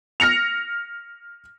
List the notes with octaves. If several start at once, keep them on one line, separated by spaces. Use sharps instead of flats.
F6 A#6 C#7 F7